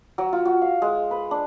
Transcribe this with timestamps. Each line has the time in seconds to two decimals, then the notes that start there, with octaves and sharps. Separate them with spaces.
0.18 F#3
0.33 F4
0.45 F#4
0.62 F5
0.82 G#3
1.11 B4
1.31 D4